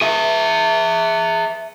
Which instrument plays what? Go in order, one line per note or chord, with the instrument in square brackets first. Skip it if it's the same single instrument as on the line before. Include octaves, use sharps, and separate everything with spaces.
[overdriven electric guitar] G#4 E5